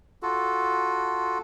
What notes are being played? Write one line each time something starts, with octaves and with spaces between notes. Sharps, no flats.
F4 F#4 A4